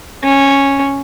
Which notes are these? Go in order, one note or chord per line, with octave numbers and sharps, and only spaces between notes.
C#4